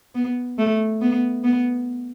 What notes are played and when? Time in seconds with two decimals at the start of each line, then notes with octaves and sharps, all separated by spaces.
0.15 B3
0.58 A3
1.02 B3
1.44 B3